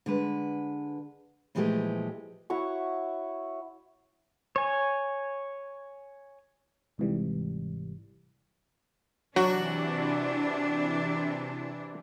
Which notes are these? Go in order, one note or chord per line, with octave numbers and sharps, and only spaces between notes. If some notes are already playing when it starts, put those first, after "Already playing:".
D3 G#3 B4
A#2 E3 F3 G#3 A3 G4
E4 F#4 C#5 C#6
C#5 G#5
G#1 G#2 C3 E3 G3
C3 E3 F#3 D4 F#4